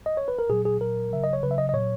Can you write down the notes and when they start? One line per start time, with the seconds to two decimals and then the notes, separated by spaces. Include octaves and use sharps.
0.06 D#5
0.17 C#5
0.28 B4
0.39 A#4
0.50 A#2 F#3 G#4
0.65 G#4
0.81 A#2 F#3 A#4
1.11 C#3 F#3 E5
1.24 D#5
1.33 C#5
1.43 C#3 F#3 B4
1.51 E5
1.58 D#5
1.69 D#5
1.73 A#2 F#3 C#5